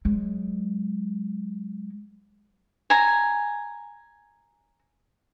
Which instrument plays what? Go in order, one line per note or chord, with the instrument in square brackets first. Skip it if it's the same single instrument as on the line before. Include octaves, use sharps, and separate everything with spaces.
[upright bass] F#3 G#3
[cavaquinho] G#5 A#5